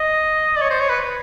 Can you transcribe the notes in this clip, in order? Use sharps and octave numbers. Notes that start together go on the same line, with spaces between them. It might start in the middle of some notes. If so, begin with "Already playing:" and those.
Already playing: D#5
D5
C#5
C5
C#5
B4